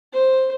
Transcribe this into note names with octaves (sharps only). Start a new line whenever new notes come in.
C5